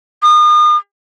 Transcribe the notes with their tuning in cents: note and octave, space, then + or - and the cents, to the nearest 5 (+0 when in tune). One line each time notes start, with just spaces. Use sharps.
D#6 -35